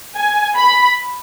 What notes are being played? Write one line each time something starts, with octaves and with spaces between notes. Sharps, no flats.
G#5
B5